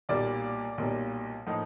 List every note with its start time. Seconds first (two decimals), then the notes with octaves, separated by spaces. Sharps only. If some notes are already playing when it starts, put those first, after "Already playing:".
0.09 B1 A#2 G3 A#3 D5
0.78 B1 A#2 G3 A#3
1.46 A2 F3 A#3 D#4